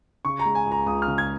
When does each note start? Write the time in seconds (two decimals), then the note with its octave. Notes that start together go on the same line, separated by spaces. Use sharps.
0.25 C#3 C#6
0.39 A#5
0.45 G#3
0.55 G#5
0.66 C#2
0.72 A#5
0.86 C#2 D#6
1.02 F6
1.08 C#3
1.18 G#6